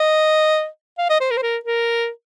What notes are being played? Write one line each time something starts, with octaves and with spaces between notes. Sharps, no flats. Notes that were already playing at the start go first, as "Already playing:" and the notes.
Already playing: D#5
F5
D#5
C5
A#4
C5
A#4
A#4